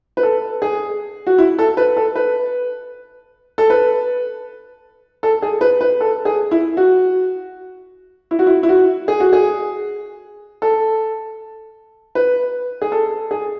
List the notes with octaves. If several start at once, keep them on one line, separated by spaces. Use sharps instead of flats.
B4
A4
G#4
F#4
E4
A4
B4
A4
B4
A4
B4
A4
G#4
B4
B4
A4
G#4
E4
F#4
E4
F#4
E4
E4
F#4
G#4
F#4
G#4
A4
B4
G#4
A4
G#4